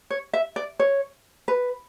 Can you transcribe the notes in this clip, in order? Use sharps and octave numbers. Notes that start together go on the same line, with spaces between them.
C#5
E5
D5
C#5
B4